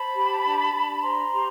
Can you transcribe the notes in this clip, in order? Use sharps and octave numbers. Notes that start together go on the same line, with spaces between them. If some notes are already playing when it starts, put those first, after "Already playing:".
Already playing: C5 A5 B5
G4
D4
D4
C5 A#5 C6
G4